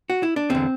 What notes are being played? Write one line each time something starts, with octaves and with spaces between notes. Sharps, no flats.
F#4
E4
D4
E2 D3 C4